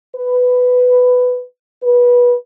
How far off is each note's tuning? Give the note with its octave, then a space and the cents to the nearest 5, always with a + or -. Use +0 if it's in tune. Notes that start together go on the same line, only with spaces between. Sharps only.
B4 +10
B4 -20